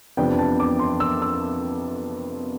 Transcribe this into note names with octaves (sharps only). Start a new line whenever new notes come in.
F2 C3 F3 B3 D4 G5
A5
D6
C6
E6
E6